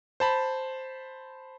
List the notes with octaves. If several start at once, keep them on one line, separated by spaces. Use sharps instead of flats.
C5 A5 B5